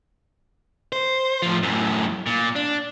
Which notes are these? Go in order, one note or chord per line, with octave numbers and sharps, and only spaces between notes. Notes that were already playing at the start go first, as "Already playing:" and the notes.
C5
A2 F3
F#2 A2
A#2
D4